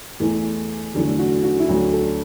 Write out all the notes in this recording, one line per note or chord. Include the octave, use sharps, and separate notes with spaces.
E2 E3 A3
E2 D3 F#3 A3
F#4
F#4
E4
D2 D3 F#3 A3 F#4
A4